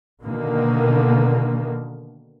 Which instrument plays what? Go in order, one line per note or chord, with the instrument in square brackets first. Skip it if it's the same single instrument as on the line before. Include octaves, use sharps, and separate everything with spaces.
[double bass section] B2 D3 D#3 A#3